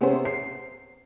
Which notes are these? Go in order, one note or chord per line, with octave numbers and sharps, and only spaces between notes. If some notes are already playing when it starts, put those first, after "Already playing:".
C3 B3 C#4 G#4 C5
C7